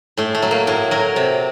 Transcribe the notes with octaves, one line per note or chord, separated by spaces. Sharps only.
A2 A3
A3
F#3
A#3
A2
F#3 A#4
C3